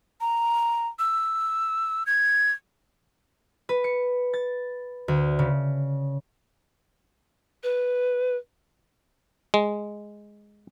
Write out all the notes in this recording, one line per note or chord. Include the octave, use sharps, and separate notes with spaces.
A#5
E6
G#6
B4
C#7
A6
D2
C#3
B4
G#3